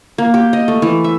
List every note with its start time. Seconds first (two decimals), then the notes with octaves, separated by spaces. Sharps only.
0.18 A#3
0.34 G4
0.53 D#5
0.68 A3
0.82 E3
1.04 E5